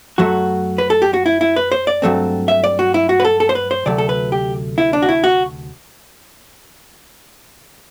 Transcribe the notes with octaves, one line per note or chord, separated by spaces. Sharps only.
F#2 F#3 A3 F#4
B4
A4
G4
F#4
E4
E4
B4
C5
D5
G2 F#3 A3 C4
E5
D5
F#4
E4
F#4
B4
A4
A4
C5
B4
C5
D2 C3 F#3 A3 D5
A4
B4
G4
E4
D4
F#4
E4
F#4